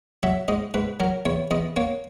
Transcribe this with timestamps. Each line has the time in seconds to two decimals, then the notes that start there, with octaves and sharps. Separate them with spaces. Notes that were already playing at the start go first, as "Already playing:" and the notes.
0.23 F#3 E5
0.48 G#2 D#5
0.74 G#2 B4
1.00 F#3 A#4
1.26 E2 C#5
1.51 E2 D#5
1.76 A#3 C#5